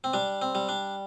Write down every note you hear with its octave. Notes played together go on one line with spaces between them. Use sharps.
C4
G3 D4
C4
G3
D4